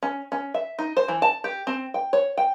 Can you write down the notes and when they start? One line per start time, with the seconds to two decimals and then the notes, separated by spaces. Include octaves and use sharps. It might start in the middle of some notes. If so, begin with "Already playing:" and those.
0.03 C#4
0.32 C#4
0.54 E5
0.79 D#4
0.97 C5
1.08 E3
1.22 A5
1.44 G4
1.67 C4
1.94 G5
2.13 C#5
2.38 G5